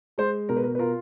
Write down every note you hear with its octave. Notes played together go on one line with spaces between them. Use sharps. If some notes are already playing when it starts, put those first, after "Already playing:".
G#3 C5
B2 A#4
B4
A#4
B4
F4 A#4